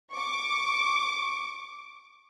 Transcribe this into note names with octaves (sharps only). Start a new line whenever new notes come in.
C#6 D6